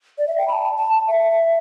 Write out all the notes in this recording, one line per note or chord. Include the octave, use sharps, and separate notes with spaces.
D5
E5
G5
B5
A5
A5
E5